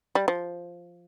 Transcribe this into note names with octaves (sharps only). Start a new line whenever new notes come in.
G3
F3